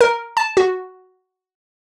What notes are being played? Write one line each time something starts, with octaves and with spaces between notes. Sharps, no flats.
A#4
A5
F#4